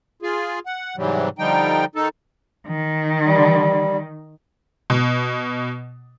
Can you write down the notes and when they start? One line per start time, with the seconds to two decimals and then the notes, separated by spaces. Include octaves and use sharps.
0.22 F4 G#4
0.66 F#5
0.97 G#2 C3 E3 F#3 G3
1.39 D3 F3 G3 D#4 G5
1.95 D#3 D#4 A4
2.68 D#3
3.26 G3
4.90 B2